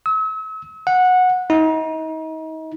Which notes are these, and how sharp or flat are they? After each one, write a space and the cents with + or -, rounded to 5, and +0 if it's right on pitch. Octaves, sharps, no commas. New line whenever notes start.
E6 -40
F#5 -15
D#4 +35